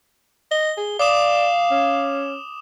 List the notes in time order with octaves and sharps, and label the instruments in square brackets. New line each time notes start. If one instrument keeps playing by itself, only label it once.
[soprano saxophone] D#5 [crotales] G7
[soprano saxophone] G#4
[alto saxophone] D5 [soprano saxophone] F5 [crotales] D6 D#6 E7
[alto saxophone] C#4